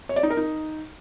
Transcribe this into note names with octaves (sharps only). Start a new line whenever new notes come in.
C#5
D5
D#4
A#4
D#4